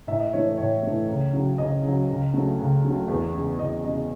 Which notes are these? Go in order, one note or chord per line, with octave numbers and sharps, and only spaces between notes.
A2 E5
D#5
E3 A3 C#5
C#5
A2 C#5
E3 A3
C#2
C#3 F#3
C#2 D#5
C#3 F#3
C#2
C#3 F#3 A3
C#2
C#3 F#3 A3
E2
C#3 G#3
E2 D#5
C#3 G#3 D#5